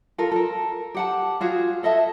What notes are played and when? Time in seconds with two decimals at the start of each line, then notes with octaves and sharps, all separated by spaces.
0.18 F4 A4 A#4
0.32 A4 A#4
0.95 G4 F#5 A5
1.41 F4 F#4 G#4
1.83 A4 D#5 E5 A5